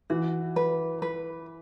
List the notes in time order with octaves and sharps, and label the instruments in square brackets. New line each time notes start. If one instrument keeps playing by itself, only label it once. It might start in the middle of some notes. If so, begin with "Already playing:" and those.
[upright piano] E3 [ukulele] F#4
[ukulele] B4
B4